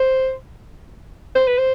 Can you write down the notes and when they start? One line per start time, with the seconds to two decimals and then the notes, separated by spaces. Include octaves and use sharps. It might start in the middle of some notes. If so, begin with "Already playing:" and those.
Already playing: C5
1.35 C5
1.47 B4
1.58 C5